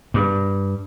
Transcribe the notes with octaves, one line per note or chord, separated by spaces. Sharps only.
G2